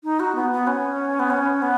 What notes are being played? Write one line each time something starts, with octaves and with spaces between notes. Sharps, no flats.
D#4
F#4
B3
B3
C#4
B3
C#4
B3